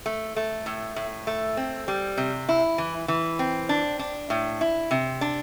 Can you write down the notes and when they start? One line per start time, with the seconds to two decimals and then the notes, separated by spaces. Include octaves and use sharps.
0.06 A3
0.36 A3
0.66 A2
0.96 A2
1.27 A3
1.57 C4
1.88 G3
2.17 C3
2.49 E4
2.78 E3
3.08 E3
3.39 C4
3.69 D4
3.99 D4
4.30 A2
4.61 E4
4.91 C3
5.21 D4